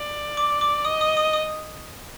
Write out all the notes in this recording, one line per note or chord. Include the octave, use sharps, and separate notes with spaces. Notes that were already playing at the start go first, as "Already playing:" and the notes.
Already playing: D5
D6
D6
D#5 D#6
D#6
D#6
D#6